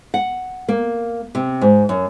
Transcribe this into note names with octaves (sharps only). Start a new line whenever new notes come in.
F#5
A#3
C3
G#2
F#2